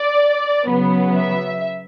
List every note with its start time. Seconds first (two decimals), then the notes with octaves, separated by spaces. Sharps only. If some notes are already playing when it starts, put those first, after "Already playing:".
Already playing: D5
0.67 C#3 F#3 B3
1.16 E5